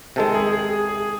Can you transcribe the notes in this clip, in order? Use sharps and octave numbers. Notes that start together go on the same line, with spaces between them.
C3 D#3 G#3 A4
G#4
G#4
G#4
G#4